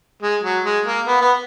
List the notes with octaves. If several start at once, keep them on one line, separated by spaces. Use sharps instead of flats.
G#3
F#3
G#3
A#3
B3
B3